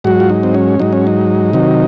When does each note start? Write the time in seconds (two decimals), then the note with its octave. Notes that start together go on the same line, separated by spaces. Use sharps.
0.04 G#2 F#3 F#4
0.20 F4
0.30 D#4
0.43 C4
0.54 C#4
0.79 G#2 F#3 D#4
0.93 C#4
1.07 D#4
1.53 C3 D#3 F#3